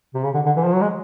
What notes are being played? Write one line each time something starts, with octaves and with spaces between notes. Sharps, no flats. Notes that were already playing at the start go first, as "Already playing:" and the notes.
C3
C#3
D3
D3
E3
F3
F#3
G#3